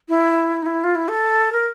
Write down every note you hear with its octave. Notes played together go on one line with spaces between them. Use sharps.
E4
D#4
E4
F4
E4
A4
A#4